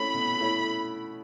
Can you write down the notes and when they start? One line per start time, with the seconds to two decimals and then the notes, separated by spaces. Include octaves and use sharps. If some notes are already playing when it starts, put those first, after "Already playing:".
Already playing: A3 C#4 E4 B5
0.14 B2
0.40 A3 C#4 E4